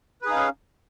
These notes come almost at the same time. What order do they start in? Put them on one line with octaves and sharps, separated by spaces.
B4 G#4 D#4 F5 C#4